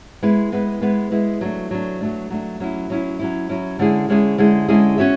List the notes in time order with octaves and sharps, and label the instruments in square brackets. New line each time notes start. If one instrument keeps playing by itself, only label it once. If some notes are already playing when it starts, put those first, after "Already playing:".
[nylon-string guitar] G#3 B3 E4 B4
G#3 B3 E4 B4
G#3 B3 E4 B4
G#3 B3 E4 B4
F#3 A3 D4
F#3 A3 D4
F#3 A3 D4
F#3 A3 D4
F#3 C#4 E4
F#3 C#4 E4
F#3 C#4 E4
F#3 C#4 E4
D3 G#3 C#4 E4 G#4
D3 G#3 C#4 E4 G#4
D3 G#3 C#4 E4 G#4
D3 G#3 C#4 E4 G#4
C#4 F#4 C#5 E5